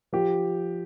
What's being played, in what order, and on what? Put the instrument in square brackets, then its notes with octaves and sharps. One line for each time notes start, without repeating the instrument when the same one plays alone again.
[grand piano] F3 G4